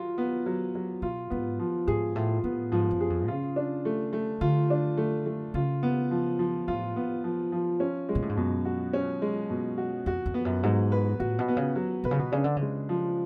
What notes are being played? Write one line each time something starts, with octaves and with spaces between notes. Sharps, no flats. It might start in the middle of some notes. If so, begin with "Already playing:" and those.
Already playing: F#3 F4
B3
F#3
F#3
B2 F4
G#2 B3
F3
G#2 G#4
A2 F4
A2 B3
G#2 F3
F#2
G#4
F2
C#3 F4
D4
A3
A3
D3 F4
D4
A3
A3
C#3 F4
B3
F3
F3
A2 F4
B3
F3
F3
C#4
G#3
B2
A2
G#2
F#2 B2
F#4
C#4
G#3
B2
F#4
F2 F#4
F2
B3
F#2
G#2 F#3
B4
A2 F#4
B2
B3
C#3
F#3
B2 B4
C#3
B2
C#3 D4
D3
C#3 G#3
F3